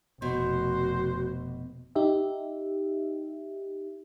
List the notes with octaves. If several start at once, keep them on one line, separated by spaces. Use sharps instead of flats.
F1 B2 F#4 C5
D#4 G4 E5